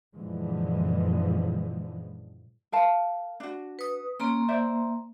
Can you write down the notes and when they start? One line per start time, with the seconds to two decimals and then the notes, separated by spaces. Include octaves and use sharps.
0.14 F#2 A#2 D3 E3 F3 G#3
2.72 A#4 F5 A5
3.40 D4 F#4
3.79 B4 D#6
4.20 A#3 C#4 A#5 C6
4.48 C5 D5 E5